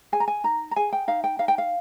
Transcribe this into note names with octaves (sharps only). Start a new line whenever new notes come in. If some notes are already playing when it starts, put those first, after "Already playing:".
G#4 G#5
A#5
G#5
D#4 A#5
A#5
G#4 G#5
G5
D#4 F5
G5
D#4 F5
G5
F5